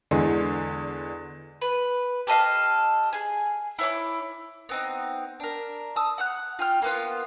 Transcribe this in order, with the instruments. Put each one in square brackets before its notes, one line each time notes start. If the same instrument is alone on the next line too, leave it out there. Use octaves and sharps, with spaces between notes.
[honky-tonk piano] E2 D3 G#3
[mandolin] B4
G4 A4 D#5 F5
G#4 G#5
E4 C#5 D6
B3 C4 D#4
D4 A#4
A5 D#6 E6
F#5 F6 F#6
F4 G5 F6
A#3 B3 F4